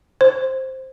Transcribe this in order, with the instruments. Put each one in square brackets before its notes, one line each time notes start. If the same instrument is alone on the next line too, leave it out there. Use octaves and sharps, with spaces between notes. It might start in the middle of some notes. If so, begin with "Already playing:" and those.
[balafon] C5